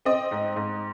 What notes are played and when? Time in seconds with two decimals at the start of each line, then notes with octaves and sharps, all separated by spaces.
0.05 C4 D#5
0.31 G#2
0.56 G#2